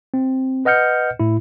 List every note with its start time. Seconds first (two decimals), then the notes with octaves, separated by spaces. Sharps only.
0.14 C4
0.65 B4 D#5 F#5 F6 G6 C#7
1.20 A2 E4